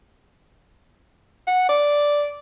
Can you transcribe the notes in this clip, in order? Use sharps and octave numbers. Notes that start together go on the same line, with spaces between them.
F#5
D5